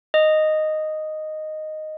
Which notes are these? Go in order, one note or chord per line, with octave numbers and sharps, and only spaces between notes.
D#5